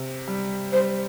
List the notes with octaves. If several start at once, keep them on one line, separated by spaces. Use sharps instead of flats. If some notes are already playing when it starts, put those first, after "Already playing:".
Already playing: C3
G3
G3 C5